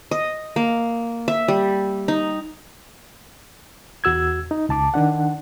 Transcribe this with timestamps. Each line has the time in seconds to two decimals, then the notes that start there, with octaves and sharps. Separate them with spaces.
0.11 D#5
0.56 A#3
1.28 E5
1.48 G3
2.08 D#4
4.04 E2 F#4 E6 G#6
4.51 D#4
4.69 C#2 A5 D6
4.94 D#3 D4 F#5